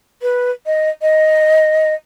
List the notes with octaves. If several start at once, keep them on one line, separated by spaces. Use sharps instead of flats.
B4
D#5
D#5